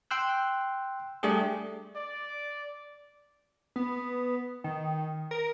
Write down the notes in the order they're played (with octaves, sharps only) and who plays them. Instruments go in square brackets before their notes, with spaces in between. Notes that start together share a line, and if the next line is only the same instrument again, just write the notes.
[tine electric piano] G5 C6 E6 F#6
G3 A3 D4 G4 G#4
[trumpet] D5
[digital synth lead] B3
D#3
A#4